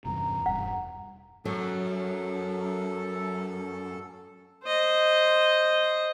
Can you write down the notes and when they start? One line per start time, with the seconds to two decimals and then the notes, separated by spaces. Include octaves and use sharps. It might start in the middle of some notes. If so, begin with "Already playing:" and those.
0.05 E2 G2 C3 A#5
0.46 E1 G2 F#5
1.45 F#2 F#3 A4
4.64 C5 D#5